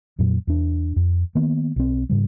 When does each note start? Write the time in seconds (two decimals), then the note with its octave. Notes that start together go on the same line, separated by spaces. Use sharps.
0.19 F2 A#2 F#3
0.47 E2 D4
0.96 F2
1.35 D#3 A#3 B3
1.76 B1 C4
2.09 G#2 C#3 G3